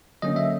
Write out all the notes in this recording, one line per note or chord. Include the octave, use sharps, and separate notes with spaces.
D3 F#3 A#3 C#4 D#5
E5